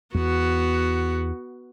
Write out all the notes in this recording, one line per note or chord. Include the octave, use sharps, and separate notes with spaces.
E2 B3 F#4